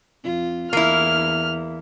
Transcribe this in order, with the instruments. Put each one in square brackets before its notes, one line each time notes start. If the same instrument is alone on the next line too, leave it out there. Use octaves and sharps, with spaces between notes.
[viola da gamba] F2 F4
[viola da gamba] E2 [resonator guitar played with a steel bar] A#3 E4 [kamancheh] F6